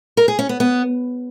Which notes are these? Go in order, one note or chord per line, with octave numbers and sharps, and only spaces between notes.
A#4
G#4
C#4
B3
B3